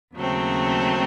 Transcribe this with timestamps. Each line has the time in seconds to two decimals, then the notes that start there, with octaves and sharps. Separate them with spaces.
0.14 D#2 C#3 F#3 A3 C4